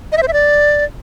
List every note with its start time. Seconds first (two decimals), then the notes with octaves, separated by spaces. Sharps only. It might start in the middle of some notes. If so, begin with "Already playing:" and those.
0.12 D#5
0.17 E5
0.23 C5
0.28 E5
0.33 D5